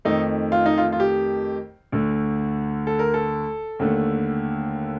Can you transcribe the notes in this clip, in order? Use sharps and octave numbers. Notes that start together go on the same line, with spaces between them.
F2 D#3 A3 D#4
F4
D#4
F4
F4
G4
D2 D3 A3
A4
A#4
A4
D#2 D3 A3